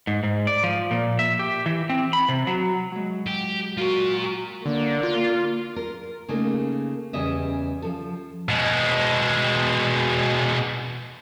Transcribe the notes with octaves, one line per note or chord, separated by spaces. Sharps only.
G#2
G#2
D5
F3
A#2
E5
G4
E3
C4
B5
C3
F#3
F#3 G#3
G4
F4 F#4 A#4
D3 A#3 D5
F4
A#4
C#3 A3 A#3 D#4
E2 C#3 G3 C#4 D#5 E5
F3 A4
B2 G#3